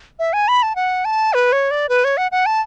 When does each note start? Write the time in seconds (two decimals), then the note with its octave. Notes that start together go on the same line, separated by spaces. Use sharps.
0.19 E5
0.33 G#5
0.48 B5
0.63 A5
0.76 F#5
1.05 A5
1.34 B4
1.52 C#5
1.71 D5
1.89 B4
2.04 C#5
2.17 F#5
2.32 F#5
2.46 A5